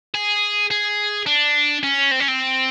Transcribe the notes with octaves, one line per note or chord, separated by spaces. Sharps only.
G#4
G#4
D4
C#4
C4
C#4
C4